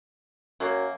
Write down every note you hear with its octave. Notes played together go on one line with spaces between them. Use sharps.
F#2 F#3 A#3